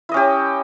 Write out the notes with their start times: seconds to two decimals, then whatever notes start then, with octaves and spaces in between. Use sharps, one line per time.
0.09 E4
0.12 D#5
0.14 C#4
0.17 G4